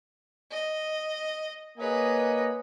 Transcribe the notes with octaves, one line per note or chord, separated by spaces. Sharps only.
D#5
A#3 G#4 B4 C#5 D#5